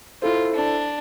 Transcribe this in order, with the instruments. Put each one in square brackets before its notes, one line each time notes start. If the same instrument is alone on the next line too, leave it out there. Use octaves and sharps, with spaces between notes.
[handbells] E4 A4 C5 [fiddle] F4
[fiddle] D4